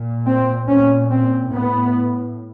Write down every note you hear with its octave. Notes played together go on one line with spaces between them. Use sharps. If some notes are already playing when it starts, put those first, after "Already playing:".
Already playing: A#2
C4
A#2 C#4
C4
A2 B3